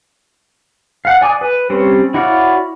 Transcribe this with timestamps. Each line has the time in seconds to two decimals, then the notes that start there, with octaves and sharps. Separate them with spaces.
1.05 F5 F#5 F#6
1.21 D5 G#5 D6 D#6
1.41 B4
1.70 G3 C4 C#4 C5 C#5
2.14 E4 F#4 C#5 D5 F5